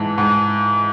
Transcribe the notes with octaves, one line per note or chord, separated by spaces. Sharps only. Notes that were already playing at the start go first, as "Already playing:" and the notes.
Already playing: G#2 E3 A5
G#2